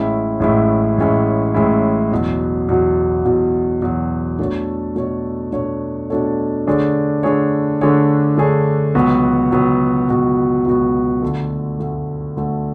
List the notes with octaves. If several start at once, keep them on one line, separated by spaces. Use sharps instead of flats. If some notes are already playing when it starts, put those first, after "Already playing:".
Already playing: A1 A2 G#3 C#4 E4
A1 A2 G#3 C#4 E4
A1 A2 G#3 C#4 E4
A1 A2 G#3 C#4 E4
E2 B2 F#3
E2 B2 F#3
E2 B2 F#3
E2 B2 F#3
B2 A3 D4 A4 C#5
B2 A3 D4 A4 C#5
B2 A3 D4 A4 C#5
B2 A3 D4 A4 C#5
D3 A3 D4 G#4 C#5
D3 A3 D4 G#4 C#5
D3 A3 D4 G#4 C#5
D3 A3 D4 G#4 C#5
C#2 B2 F#3 B3 F#4
C#2 B2 F#3 B3 F#4
C#2 B2 F#3 B3 F#4
C#2 B2 F#3 B3 F#4
D2 D3 A3
D2 D3 A3
D2 D3 A3